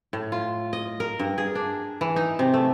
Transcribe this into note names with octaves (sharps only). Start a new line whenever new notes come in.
A2
F4
D#5
A#4
G2
G#4
D4
E3
D#4
C3
A3